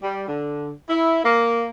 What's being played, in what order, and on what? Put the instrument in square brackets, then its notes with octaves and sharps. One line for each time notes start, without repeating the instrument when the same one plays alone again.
[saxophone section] G3
D3
E4
A#3